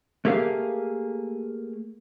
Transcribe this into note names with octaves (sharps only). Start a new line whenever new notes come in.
A3 A#3 G4 G#4 F5